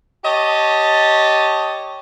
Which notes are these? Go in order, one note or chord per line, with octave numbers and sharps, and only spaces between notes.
G4 C#5 D#5 A5